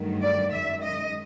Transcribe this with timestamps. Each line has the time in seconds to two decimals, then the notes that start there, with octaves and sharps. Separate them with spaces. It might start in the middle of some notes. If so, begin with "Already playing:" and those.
Already playing: G2 D#3 F#3 A3
0.22 D5
0.52 F#2 D#3 G#3 E5
0.83 D#5